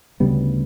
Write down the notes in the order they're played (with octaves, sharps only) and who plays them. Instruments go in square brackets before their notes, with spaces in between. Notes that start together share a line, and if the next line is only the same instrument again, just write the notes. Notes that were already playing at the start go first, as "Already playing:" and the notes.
[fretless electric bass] D2 C#3 G3 B3